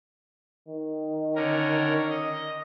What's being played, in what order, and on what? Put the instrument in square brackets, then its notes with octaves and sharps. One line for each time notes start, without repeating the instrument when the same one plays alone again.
[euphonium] D#3
[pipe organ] D3 C#4 A#4
D#5